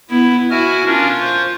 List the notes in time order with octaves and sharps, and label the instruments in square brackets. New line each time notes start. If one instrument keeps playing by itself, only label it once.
[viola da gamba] B3 [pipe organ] E4
[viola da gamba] E4 [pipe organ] F#4 G#5 F6
[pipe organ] C#4 D4 A#4 [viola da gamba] F4
[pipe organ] C5 C#6